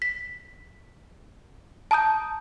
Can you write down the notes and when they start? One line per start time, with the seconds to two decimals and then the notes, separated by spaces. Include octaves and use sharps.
0.02 B6
1.91 A5 A#5 D#6 G6